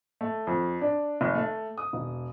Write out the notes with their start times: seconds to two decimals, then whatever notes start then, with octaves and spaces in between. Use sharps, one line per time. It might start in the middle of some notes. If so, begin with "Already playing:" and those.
0.21 A3
0.47 F2
0.81 D4
1.21 F1
1.35 A3
1.78 D#6
1.93 E1